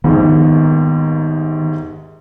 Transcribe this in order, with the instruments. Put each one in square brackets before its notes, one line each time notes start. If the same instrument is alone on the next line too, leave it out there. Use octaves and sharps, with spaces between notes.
[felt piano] A#1 D#2 G#2 [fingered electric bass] D#3 B3